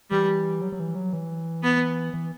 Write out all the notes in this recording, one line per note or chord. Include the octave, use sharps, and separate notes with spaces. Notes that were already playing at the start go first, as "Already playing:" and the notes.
E3 G3
F#3
F#3
E3
F#3
E3
B3
E3